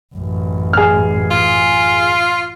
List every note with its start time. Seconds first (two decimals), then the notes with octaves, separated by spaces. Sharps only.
0.15 A1 F#2
0.73 G#4 F6
1.31 F4